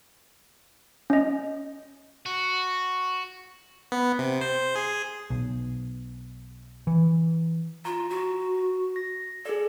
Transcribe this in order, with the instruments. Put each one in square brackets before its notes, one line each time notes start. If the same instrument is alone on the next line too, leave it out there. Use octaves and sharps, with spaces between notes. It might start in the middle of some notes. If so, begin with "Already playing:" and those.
[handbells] C#4 D#5
[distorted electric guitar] F#4
[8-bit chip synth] B3
C3
C5
G#4
[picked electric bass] B1
E3
[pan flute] F4 [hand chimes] A#5
[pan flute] F#4
[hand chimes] A#6
[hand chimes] G#4 D5 [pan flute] A4